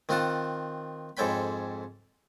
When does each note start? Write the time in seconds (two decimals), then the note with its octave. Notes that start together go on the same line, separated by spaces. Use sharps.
0.09 D#3 C4 F4 F#5 A5
1.17 F2 G#2 A4 C#5 G5 B5